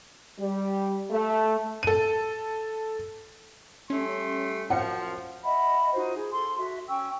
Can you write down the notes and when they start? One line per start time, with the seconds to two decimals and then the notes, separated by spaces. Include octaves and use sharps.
0.39 G3
1.10 A3
1.83 A4 D#7
3.90 G3 A3 C#4 C6
4.70 F#2 F3 F#5 C#7
5.44 D#5 E5 F#5 B5
5.94 D#4 F4 F#4 C5
6.16 G#4
6.32 A4 C6
6.58 F#4 E5
6.88 C#4 G5 C#6 E6